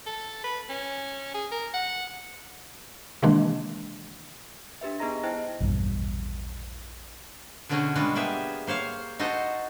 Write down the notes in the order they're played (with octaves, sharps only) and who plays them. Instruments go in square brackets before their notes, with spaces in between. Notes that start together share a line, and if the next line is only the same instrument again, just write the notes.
[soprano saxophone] A4
B4
C#4
G#4
A#4
F#5
[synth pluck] C3 D#3 E3 G#3 A#3 D4
[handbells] D4 G4 B4 E5
B3 D#4 G#4 D#5 A#5 A#6
E4 C5 D#5 G5 A5
[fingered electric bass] A#1 E2 G2 B2
[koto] B2 D3 A3 C#4 F#4 G#4
G3 G#3 B3 D4 F4 F#4
A#3 B3 G4 G#4 E5
A#3 C5 C#5 F5
D#4 F#4 A4 C5 D#5